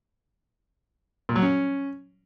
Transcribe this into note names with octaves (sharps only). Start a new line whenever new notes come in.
A#2
F#3
C#4